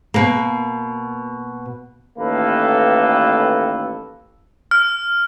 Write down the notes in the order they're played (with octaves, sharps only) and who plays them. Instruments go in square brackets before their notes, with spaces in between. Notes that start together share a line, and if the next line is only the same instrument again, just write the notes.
[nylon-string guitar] B2 A#3
[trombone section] A1 D#3 A#3 A4 B4
[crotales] F6